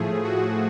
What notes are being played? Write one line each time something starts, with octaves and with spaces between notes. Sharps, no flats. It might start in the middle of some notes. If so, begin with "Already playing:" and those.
Already playing: A2 F3 A3 G#4
F#4